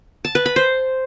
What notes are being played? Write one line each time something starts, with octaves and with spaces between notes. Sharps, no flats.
A5
B4
B5
C5